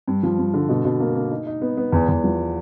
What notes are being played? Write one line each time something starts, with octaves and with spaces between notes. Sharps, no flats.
G2
F3
G2
D3
B2
B2
A#3
A#3
D#4
D#4
B3
B3
E2
E2
F3